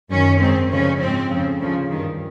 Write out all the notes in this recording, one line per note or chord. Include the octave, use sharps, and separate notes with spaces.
F#2 D#3 C#4
G#2 D#3 C4
D2 C#3 F3 C#4
G#2 F3 C4
F2 C#3 F3
D2 C#3 F3
G2 D#3